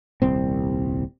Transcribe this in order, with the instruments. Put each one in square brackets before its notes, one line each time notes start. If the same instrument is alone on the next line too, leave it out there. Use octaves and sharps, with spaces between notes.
[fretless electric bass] D#1 C2 C4